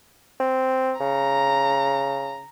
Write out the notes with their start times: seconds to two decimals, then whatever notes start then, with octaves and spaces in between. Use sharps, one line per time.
0.40 C4
1.00 C#3 A#5